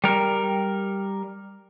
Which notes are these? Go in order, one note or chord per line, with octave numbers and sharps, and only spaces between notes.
G3 A#4